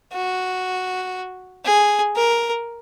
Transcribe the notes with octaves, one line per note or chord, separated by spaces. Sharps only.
F#4
G#4
A#4